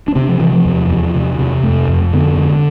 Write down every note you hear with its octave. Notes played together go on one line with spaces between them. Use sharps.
D4
C3 C4
F3
C3 E3
F3
E2
E2
C3
C3
F2 A3
F2
D3 B3
D3